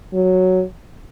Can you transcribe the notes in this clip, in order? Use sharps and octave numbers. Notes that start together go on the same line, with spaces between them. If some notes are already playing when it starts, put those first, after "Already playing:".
F#3